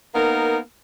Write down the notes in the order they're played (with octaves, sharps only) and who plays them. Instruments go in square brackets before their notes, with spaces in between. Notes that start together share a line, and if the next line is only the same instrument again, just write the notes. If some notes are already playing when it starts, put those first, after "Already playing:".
[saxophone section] A#3 B3 D#4 A#4